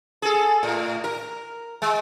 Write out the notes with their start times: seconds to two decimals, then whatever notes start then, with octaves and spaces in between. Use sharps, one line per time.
0.22 G#4 A4
0.63 A2
1.04 A#4
1.82 G#3